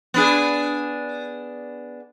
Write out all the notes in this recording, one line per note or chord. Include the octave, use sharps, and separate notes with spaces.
B3 D4 G#4